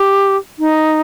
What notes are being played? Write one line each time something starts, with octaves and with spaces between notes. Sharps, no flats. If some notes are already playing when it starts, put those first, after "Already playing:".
Already playing: G4
D#4